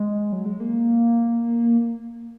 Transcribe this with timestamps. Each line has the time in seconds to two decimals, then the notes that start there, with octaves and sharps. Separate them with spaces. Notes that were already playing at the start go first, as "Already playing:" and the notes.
Already playing: G#3
0.32 F#3
0.46 G#3
0.60 A#3